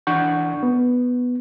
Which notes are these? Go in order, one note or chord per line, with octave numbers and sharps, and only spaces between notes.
E3 D4 F#5 C#6 G6
B3